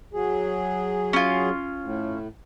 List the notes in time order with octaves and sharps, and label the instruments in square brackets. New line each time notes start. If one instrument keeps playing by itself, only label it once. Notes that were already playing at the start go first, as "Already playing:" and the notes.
[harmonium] F#3 G#4
[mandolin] C#4 F4
[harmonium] A2